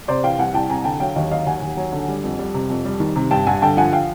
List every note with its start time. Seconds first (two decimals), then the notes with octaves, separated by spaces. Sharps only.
0.08 C3 C5 D5
0.24 E3 F5 G5
0.39 C2 F#5 G#5
0.54 C2 G5 A5
0.69 C3 G#5 A#5
0.85 D3 G5 A5
1.00 F#3 F5 G5
1.15 D#2 D#5 F5
1.31 F#3 D#5 F5
1.46 D#2 F#5 G#5
1.62 D#2
1.77 F#3
1.93 D3
2.08 G3
2.24 F2
2.39 G3
2.54 C3
2.70 F2
2.85 G3
3.00 D#3
3.16 C3
3.31 G2 G5 A5
3.47 G2 F#5 G#5
3.62 D3 G5 A5
3.77 F3 F#5 G#5
3.93 F5 G5